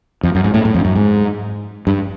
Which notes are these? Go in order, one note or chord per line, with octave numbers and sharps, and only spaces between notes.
F2
F#2
G#2
A2
A2
F2
F#2
G#2
G2